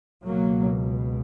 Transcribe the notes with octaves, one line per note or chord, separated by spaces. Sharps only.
C#2 B2 F#3 A#3